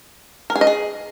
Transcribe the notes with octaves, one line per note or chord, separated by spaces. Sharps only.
A#4
G#4
D#5
G#4